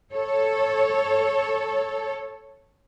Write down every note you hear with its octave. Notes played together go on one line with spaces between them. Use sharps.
A4 C#5